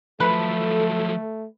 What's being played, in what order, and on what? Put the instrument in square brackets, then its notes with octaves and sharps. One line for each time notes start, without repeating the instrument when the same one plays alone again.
[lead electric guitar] F3 F#3 [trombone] A3 [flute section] A4 [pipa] B4